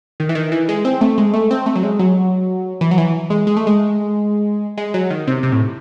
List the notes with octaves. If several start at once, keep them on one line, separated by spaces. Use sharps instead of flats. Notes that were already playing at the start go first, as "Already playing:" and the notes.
D#3
E3
D#3
E3
G#3
C4
A3
G#3
A3
C4
A3
F#3
G#3
F#3
E3
F#3
E3
G#3
G#3
A3
G#3
G#3
F#3
D#3
C3
C3
A2